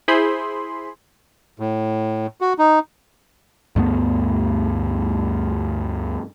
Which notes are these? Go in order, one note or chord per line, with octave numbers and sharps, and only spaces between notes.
E4 G#4 C5 B5 C6
A2
F#4
D#4
D2 G2 A3 B3